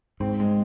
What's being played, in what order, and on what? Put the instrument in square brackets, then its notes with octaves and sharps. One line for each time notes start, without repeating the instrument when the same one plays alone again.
[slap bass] G#2 [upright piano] C4
[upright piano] G#3